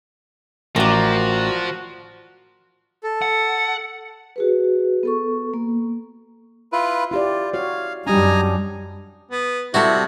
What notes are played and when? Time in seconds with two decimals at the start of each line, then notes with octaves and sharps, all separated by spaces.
0.76 A1 F3 F#4 A#4 D5
3.03 A4
3.22 F#5
4.36 F#4 G#4 B4
5.03 B3 A4 C#6
5.54 A#3
6.72 E4 F4 B4
7.11 E4 F4 G4 D5
7.54 F#4 C#5 F5
8.07 F#2 G3 D4 D#4 G4 G#5 A#5
9.31 B3
9.74 C3 G3 E4 F#4 A4